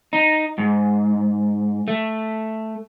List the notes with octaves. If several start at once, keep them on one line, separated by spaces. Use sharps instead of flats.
D#4
G#2
A3